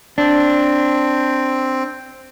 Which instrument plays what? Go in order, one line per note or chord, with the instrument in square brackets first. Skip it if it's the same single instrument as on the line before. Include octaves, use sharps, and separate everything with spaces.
[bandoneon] C4 [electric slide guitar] D4